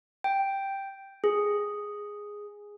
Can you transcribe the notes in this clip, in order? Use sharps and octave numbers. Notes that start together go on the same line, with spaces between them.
G5
G#4